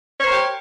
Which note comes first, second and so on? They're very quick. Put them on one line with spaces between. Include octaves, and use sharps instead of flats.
C#5 C5 A#4 G4